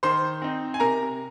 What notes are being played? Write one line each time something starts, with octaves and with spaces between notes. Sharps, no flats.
D#3 C5 C6
C4 D#4
G#5
C3 A#4 A#5